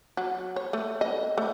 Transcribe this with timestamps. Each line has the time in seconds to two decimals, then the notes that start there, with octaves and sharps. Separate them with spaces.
0.17 F#3
0.56 C#5
0.73 A3
1.01 D#5
1.38 A3